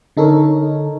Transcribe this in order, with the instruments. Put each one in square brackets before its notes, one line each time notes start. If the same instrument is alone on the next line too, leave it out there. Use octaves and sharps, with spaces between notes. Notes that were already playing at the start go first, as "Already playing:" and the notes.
[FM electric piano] D3 D#4 A4 A#4 C#5